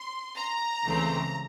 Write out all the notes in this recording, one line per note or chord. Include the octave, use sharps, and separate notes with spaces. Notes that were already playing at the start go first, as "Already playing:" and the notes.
Already playing: C6
A#5
C#2 C#3 E3 A3 C4